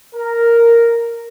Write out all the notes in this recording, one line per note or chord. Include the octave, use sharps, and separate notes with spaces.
A#4